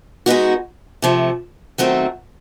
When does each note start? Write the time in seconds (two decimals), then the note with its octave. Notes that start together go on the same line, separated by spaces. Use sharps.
0.26 G#3 B3 D#4 F#4
1.02 C3 F3 A3
1.78 D#3 F#3 A3 C4